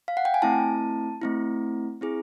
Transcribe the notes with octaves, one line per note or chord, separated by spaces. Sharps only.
F5
F#5
G5
G#5
A3 C4 E4 A5
A3 C4 E4
C4 E4 G#4